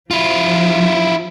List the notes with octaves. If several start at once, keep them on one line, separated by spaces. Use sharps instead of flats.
F3 E4 F4